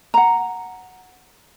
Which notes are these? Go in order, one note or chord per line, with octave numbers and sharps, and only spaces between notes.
F#5 A#5